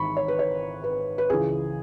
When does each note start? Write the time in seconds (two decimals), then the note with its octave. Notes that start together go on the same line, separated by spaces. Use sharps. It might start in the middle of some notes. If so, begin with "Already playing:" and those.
Already playing: G#1 G#2 E3 B5 C#6
0.17 C#5
0.28 B4
0.39 C#5
0.84 B4
1.18 B4
1.29 C#2 C#3 E3 G#4